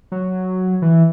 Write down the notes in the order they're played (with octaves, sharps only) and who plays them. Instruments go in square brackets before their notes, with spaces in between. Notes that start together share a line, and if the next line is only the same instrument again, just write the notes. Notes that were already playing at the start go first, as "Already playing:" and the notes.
[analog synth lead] F#3
E3